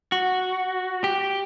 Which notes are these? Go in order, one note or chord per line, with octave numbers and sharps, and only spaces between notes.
F#4
G4